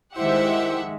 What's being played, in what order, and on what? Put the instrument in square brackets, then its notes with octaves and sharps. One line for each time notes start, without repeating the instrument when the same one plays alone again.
[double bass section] D#3 G#3 [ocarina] E4 [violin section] G4 E5 F#5 [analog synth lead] C5